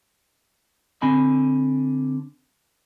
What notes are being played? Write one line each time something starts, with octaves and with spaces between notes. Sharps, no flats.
D3 C4 G#5 B5